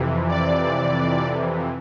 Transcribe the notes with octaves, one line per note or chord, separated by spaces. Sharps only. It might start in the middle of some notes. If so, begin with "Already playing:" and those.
Already playing: F2 C3 E3
D5